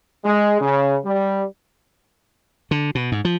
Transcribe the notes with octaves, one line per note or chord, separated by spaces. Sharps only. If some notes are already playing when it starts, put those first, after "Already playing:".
G#3
C#3
G3
D3
B2
G#2
F3